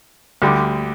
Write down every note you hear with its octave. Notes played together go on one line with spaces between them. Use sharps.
D2 D3 G3